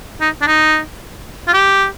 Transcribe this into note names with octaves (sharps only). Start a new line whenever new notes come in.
D#4
D4
D#4
F4
G4